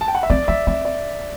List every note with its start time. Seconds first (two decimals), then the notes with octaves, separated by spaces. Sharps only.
0.01 A5
0.08 G5
0.15 F#5
0.23 E5
0.30 C4 D5
0.48 D4 E5
0.67 C4 E5
0.85 D5